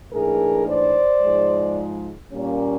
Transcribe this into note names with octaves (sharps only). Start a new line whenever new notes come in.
G#2 E3 A3 D4 G#4 A#4
C5 D5
G#2 F3 G#3
A#2 G3 A#3 C#4